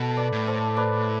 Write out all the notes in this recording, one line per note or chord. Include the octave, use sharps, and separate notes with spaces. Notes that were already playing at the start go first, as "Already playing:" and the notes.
Already playing: B2 A4
B4 D5
A2
A4 C5
B4 D5